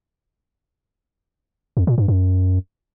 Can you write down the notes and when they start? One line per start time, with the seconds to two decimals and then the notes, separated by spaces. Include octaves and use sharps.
1.77 F2
1.87 A#2
1.98 G2
2.08 F#2